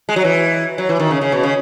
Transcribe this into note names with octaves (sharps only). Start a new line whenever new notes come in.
G#3
F#3
E3
F#3
E3
D#3
C#3
C#3
B2
C#3